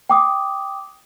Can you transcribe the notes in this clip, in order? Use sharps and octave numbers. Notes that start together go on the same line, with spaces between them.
G5 D6 D#6